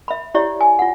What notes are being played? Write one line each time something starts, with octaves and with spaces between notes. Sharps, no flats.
E5 B5
E4 G4 C#5 D5 E5
G#5
F4 F#5